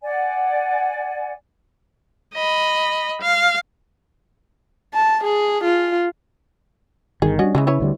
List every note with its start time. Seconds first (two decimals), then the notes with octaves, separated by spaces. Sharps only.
0.03 D5 F#5 G#5
2.34 D#5 B5
3.21 F5
4.94 A5
5.24 G#4
5.64 F4
7.22 G1 D#3 G#4
7.39 G3 C#4 D4 F#4 D#5
7.55 C#3 E3 F#3 G#3
7.67 E4 B4 C#5
7.80 D2 D3 G3